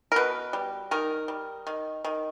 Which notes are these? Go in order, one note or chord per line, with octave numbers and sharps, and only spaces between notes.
A#4
B2 B4
G3
D#3 A#4
G3
D#3
D#3